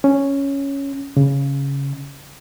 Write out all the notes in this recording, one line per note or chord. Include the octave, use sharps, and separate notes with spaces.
C#4
C#3